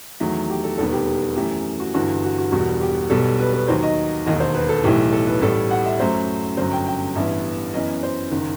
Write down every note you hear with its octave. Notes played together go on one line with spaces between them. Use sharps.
E2 D#3 F#3 A3
G4
A4
E1 D#2 D#3 G3 B3 A4
G4
F#2 E3 A3 G4
F#4
G1 G2 E3 F#4
F#4
F#4
E1 E2 B2 G3 F#4
G4
B1 B2 G3 B3 A4
B4
B4
D#2 D#3 F#3 C5
D#5
E1 D#2 D#3 D#5
C5
B4
A4
B1 A2 E3 A3 G4
A4
B4
A1 A2 G3 A4
F#5
E5
F#2 F#3 A3 C5
G1 F#2 F#3 C5
G5
G5
A1 G2 E3 B3 E5
F#2 E3 B3 D#5
C5
F#1 D#3